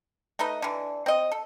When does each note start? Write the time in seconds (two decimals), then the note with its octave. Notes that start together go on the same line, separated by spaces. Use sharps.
0.39 A3 D#4 B4 D#5
0.62 D3 E3
1.06 C4 D#5
1.32 A4